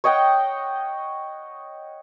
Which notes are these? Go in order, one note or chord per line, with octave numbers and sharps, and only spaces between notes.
C#5 D#5 F#5 G5